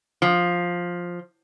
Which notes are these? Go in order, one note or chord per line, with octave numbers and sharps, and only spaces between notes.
F3